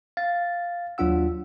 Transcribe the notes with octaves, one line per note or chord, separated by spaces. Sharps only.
F5 A6
D#2 F#3 D4 F4 F#5 E6